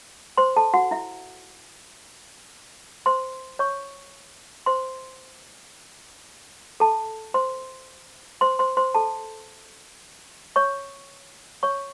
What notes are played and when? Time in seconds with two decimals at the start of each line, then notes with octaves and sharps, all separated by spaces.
0.37 C5 C6
0.56 A4 A5
0.74 F#4 F#5
0.91 E4 E5
3.06 C5 C6
3.59 C#5 C#6
4.66 C5 C6
6.80 A4 A5
7.34 C5 C6
8.41 C5 C6
8.59 C5 C6
8.77 C5 C6
8.95 A4 A5
10.56 C#5 C#6
11.63 C#5 C#6